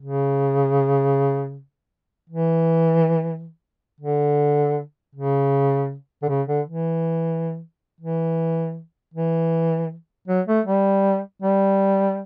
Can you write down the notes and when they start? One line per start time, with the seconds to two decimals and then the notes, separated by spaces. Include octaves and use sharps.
0.02 C#3
2.30 E3
4.01 D3
5.15 C#3
6.23 D3
6.29 C#3
6.48 D3
6.67 E3
8.01 E3
9.14 E3
10.28 F#3
10.47 A3
10.66 G3
11.42 G3